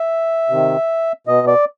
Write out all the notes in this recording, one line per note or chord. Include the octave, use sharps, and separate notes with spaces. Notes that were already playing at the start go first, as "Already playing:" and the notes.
Already playing: E5
C3 D#3
B2 D#5
D5